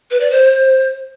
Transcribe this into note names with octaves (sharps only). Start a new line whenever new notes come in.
B4
D5
C5